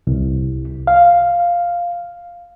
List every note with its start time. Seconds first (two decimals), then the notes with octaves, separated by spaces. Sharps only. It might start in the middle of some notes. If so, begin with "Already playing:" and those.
0.07 C2
0.87 F5